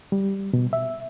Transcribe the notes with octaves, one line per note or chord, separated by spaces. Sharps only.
G3
B2
E5